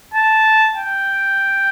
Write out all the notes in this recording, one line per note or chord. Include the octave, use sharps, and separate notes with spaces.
A5
G5